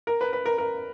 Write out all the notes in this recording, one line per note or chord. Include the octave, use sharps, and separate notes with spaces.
A#4
B4
B4
A#4
A#4